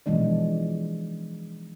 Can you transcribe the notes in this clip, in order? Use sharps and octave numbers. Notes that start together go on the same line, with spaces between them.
B2 E3 F3 G#3 D4 D5